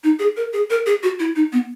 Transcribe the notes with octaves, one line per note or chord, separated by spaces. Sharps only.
D#4
G#4
A#4
G#4
A#4
G#4
F#4
E4
D#4
B3